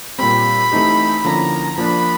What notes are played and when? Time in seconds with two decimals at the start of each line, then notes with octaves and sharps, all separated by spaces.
0.19 A#2 G3 C4 B5
0.72 E3 A3 C4 D#4 G4
1.24 D3 F3 A#3 C#4 E4 A#5
1.77 F3 A#3 D4 B5